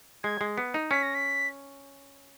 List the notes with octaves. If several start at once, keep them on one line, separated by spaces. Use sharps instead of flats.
G#3 G#6
G#3
B3
D#4
C#4 B6
A#6
B6